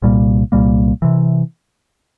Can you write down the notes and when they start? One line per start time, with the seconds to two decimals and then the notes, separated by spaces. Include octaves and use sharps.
0.02 C2 A#2 G3 A#3
0.52 C2 A#2 G3 A#3
1.02 C3 E3